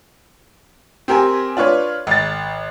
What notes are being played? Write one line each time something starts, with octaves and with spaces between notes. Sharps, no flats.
C4 G4 A#4 G#5
D4 F4 B4 C#5
G#1 A6